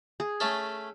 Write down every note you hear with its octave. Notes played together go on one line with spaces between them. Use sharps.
G#4
A3 C#4 A4